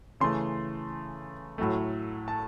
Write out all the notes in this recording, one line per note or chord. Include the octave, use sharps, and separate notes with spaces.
C#3 E3 A3 C6
A2 F#3 A3
A5